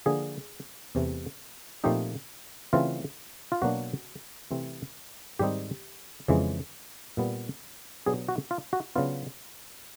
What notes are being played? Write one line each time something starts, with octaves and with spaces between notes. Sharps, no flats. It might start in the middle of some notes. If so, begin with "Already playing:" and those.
D3 F3 A#3 G#4
E2 C3 E3 A3
A#2 F3 A3 C4 D#4 G4
C#3 E3 A3 C4 F4
F4
B2 F#3 A#3 D4 F#4
C3 E3 A3 C4
G#2 D#3 G3 C4 D#4 G4
F2 C#3 E3 G#3
A#2 G3 B3
B2 F#3 B3 D4 G#4
F#4
F4
F#4
C#3 F#3 B3 D4 F4